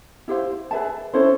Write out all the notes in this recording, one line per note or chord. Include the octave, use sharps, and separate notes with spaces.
E4 G4 C5 F5
G#4 B4 E5 A5
C#4 E4 A4 C5